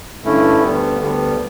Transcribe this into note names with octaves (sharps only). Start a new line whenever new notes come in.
G2 D3 A3 C#4 E4
D2 D3 G3 B3
D2 D3 G3 B3